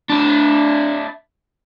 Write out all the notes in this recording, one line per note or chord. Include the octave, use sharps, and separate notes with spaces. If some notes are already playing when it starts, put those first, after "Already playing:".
D4 E4